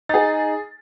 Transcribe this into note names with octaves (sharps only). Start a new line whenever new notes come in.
D#4 G#4 A6